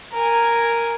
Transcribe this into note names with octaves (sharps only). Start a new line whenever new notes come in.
A#4 G#5